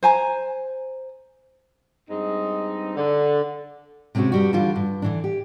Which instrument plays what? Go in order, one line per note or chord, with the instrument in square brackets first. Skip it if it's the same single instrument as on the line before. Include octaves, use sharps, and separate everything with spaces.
[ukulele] C5 G#5 A#5
[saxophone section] G2 G#3 C4 D#4
D3
[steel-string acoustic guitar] C3 G#3 C4 C#4 F#4
G2 G3 F#4
D3 E3 G3 F4
G2
D3 E3 D4
G4